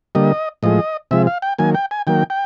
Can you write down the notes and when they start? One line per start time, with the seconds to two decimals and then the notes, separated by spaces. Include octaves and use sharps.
0.15 D3 G3 A#3 D#5
0.63 A2 F3 G#3 D#5
1.11 C3 F3 G#3 E5
1.27 F5
1.42 G5
1.58 D#3 F#3 A#3 G#5
1.75 G5
1.91 G#5
2.07 D#3 F#3 A#3 G5
2.30 G5